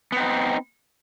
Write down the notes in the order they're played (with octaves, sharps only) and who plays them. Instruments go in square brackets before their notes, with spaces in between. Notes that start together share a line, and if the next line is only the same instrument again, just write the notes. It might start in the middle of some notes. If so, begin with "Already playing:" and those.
[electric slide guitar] B3
C4
D#4